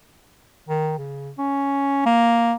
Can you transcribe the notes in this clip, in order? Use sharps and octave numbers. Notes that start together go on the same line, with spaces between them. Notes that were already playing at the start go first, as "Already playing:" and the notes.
D#3
C#3
C#4
A#3